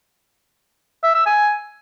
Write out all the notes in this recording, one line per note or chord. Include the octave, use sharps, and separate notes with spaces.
E5
E6
G#5